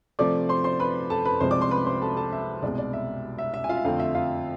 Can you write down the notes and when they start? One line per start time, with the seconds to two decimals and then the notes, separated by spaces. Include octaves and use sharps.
0.19 C3 F3 A3 D5 D6
0.49 C5 C6
0.64 C5 C6
0.80 B4 B5
1.10 A4 A5
1.25 B4 B5
1.40 C2 C3 F3 G#3 C5 C6
1.51 D5 D6
1.61 C5 C6
1.71 B4 B5
1.86 C5 C6
2.01 A4 A5
2.17 A4 A5
2.32 E5
2.62 C2 B2 G#3 D5
2.78 D5
2.93 E5
3.38 E5
3.54 E5
3.64 G#5
3.69 F4 F5
3.77 E5
3.84 F2 D3 A3 C4 F4 F5
4.00 E5
4.15 F4 F5